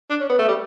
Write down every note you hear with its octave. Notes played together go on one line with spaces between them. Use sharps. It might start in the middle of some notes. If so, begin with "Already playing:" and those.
D4
C#4
B3
A3
G3